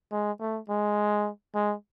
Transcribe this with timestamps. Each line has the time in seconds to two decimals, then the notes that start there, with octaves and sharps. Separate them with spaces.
0.12 G#3
0.40 A3
0.69 G#3
1.55 G#3